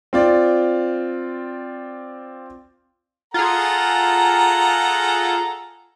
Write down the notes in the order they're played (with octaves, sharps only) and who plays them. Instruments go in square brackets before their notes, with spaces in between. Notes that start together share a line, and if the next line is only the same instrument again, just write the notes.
[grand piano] C4 F4 D5
[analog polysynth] F4 G#4 [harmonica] A4 F#5 A#5